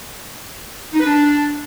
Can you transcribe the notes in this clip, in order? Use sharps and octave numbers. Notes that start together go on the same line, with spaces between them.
D#4
B4
D4